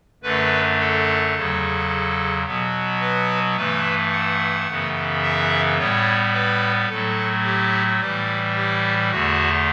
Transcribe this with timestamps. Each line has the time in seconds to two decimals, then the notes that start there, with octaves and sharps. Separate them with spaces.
0.23 F#2 D3 A3 B4
0.79 A4
1.34 E2 C#3 F#3
2.46 B2 F#3 B3
3.00 B4
3.56 G2 E3 A3 B4
4.11 F#5
4.67 F#2 C#3 E3 B3
5.22 E5
5.78 A2 G3 B3 C#5
6.34 B4
6.89 A2 F#3 A3 A4
7.45 G4
8.00 A2 E3 G3 G4
8.56 G4
9.11 E2 D3 A3 F#4